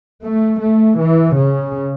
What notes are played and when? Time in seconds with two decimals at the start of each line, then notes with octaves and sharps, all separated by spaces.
0.23 A3
0.61 A3
0.99 E3
1.37 C#3